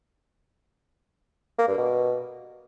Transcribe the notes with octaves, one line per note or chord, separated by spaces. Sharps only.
A#3
G2
B2